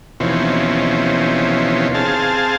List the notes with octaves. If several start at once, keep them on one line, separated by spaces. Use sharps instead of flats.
D#2 B2 E3 F3 C4 C#4
C4 G#4 F5 A5